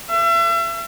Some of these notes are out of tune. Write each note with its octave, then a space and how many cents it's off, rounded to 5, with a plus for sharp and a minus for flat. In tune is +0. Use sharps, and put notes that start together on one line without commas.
E5 +40